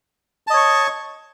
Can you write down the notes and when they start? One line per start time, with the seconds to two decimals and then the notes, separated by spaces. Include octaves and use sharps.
0.47 A5
0.50 D#5
0.53 C#5
0.57 C#6